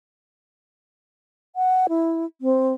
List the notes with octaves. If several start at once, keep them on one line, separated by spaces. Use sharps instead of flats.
F#5
E4
C4